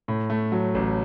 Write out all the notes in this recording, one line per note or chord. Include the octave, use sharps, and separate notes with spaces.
A2
A3
F#3
A1